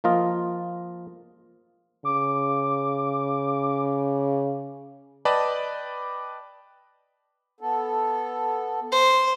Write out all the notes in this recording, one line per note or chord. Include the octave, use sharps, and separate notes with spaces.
F3 A#3 F4 D#5
C#3 D6
B4 D5 D#5 G5 A5 B5
B3 A4
C5